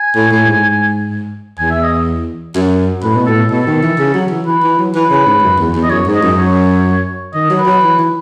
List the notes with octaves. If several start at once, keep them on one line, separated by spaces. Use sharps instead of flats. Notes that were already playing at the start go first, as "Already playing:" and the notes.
Already playing: G#5
A2
A2
G#2
E2 G#5
E5
D#5
F#2
A2 B4
B2
A2 A4
B2 A4
D#3
E3
C#3
F#3
E3
E3 B4
E3
F#3
E3 B4
C#3
G#2
F#2
E2
E2
D#5
F#2 C#5
G#2
D#5
F#2
C#5
D#3 D#5
F#3
B4
F#3
E3
E3